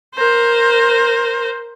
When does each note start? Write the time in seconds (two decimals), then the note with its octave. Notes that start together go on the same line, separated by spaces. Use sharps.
0.16 A#4 C5